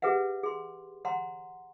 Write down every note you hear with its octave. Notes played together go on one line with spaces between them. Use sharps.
G4 G#4 B4 E5 F#5
G#4 C6
C#5 F#5 A#5 C6